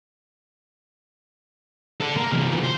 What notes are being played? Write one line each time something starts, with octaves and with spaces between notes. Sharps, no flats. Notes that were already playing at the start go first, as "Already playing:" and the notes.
A4 D5
A#3
C3 E3
D#3 F3
C5